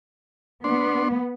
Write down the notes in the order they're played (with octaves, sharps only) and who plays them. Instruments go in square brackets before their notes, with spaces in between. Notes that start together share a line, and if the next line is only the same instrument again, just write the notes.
[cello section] B3 [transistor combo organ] D4 C6